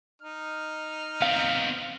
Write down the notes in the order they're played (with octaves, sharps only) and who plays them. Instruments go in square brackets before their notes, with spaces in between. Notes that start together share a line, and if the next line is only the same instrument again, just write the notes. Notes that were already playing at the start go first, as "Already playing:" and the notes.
[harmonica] D#4 F6
[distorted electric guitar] B3 C4 [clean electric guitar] F5